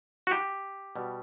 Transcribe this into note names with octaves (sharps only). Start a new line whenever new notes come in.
F#4
G4
B2 G3